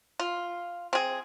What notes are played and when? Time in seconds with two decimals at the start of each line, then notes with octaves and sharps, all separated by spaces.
0.19 F4
0.93 C4 G#4